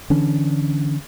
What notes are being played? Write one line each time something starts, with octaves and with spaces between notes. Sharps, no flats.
D3 E3 C#4 D4